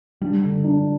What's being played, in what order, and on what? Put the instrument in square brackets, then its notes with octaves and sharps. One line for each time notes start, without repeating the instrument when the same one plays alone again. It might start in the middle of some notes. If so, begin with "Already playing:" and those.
[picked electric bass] G3 [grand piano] D4
[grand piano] D3
D4